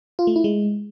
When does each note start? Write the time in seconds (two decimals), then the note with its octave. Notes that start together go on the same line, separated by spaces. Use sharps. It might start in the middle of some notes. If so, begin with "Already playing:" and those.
0.19 F4
0.27 A3
0.36 E4
0.44 G#3